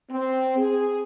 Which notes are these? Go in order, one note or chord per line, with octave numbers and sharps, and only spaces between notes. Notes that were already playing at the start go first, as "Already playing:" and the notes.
C4
G#4